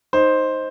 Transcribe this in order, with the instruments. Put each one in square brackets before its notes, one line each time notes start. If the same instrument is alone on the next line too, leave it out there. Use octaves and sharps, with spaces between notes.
[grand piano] D#4 C5